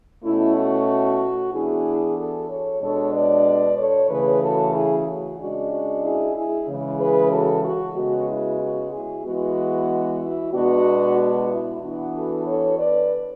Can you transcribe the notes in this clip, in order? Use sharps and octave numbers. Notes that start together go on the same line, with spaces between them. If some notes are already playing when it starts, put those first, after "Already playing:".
B2 A3 C#4 E4
F#4
E3 B3 D4 E4 G#4
F#4 A4
A4 C#5
B2 G#3 D4 A4 C#5
B4 D5
A4 C#5
C#3 E3 A3 G#4 B4
F#4 A4
E4 G#4
F#4
C#3 G#3 D4 F#4
F#4
E4 G#4
E4 G#4
C#3 E3 G#3
G#4 B4
F#4 A4
F#4
C#3 G#3 B3 F#4
E4
F#4
E4 G#4
E3 G#3 B3 F#4
E4
B2 G#3 B3 D4 F#4
F#4
E4
E3 B3 D4 F#4
F#4 A4
A4 C#5
B4 D5